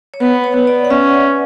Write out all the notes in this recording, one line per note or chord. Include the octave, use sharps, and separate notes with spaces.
C#5
B3 B4
C#5
B3
D5
F#5
C#4 E5